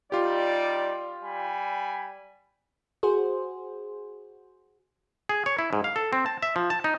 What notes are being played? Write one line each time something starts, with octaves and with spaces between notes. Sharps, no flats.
G3 D#4 F4 G4 D5
G3 G#5 B5
F#4 G#4 C5
G#4
C#5
E4
G#2
F5
A4
C4
A5
E5
F3
A5
D#4